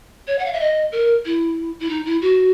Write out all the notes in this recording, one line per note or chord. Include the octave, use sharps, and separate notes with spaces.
C#5
F#5
F5
E5
D#5
A#4
E4
E4
D#4
E4
F#4